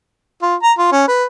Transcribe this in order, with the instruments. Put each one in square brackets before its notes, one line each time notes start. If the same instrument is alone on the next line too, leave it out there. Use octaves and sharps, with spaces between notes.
[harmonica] F4
A#5
F4
C#4
B4